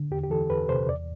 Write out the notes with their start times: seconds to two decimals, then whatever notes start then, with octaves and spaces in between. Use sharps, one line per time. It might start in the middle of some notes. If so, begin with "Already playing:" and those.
Already playing: D3
0.11 E2 G4
0.23 G4
0.30 E3 A4
0.50 E2 B4
0.69 C3 C5
0.88 E2 D5